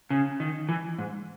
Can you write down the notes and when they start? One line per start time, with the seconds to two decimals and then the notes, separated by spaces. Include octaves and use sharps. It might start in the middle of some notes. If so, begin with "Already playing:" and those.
0.10 C#3
0.40 D#3
0.69 E3
0.99 G#2